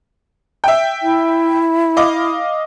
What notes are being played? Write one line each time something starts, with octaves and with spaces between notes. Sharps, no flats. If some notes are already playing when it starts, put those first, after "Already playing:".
E5 G5
E4
D#5 F5 D6